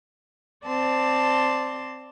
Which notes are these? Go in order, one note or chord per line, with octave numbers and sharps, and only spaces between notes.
C4 D5 A5 C6